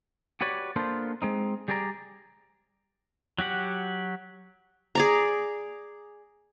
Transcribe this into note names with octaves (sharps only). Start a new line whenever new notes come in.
F#4 G4 B4 C#5 D5
A#3 B3 D4 F4 A4 C5
G#3 C4 D#4
G3 G4 G#4 D5 A#5
F#3 F#4 G4 F#5
G#4 D5 A#5